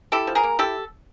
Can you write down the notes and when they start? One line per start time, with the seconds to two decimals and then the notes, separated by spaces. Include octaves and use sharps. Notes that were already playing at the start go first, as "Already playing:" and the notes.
0.12 E4 G4 A4
0.27 F3
0.35 G#4 A#4
0.43 A#3
0.59 E4 G4 A4